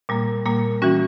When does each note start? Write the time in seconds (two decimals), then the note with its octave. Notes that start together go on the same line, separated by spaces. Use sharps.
0.09 A#2 G3 A#3
0.46 A#2 G3 A#3
0.82 E3 G3 C#4 F#4